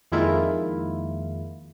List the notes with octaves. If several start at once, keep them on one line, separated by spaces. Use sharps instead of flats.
F2 D#3 G#3 A#3 E4 F4